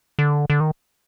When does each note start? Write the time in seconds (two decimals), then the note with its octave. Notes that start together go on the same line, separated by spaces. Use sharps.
0.19 D3
0.50 D3
0.60 D#3